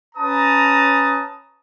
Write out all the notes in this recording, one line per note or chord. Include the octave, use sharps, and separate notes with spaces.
C#4 B4 A5 A#5 D#6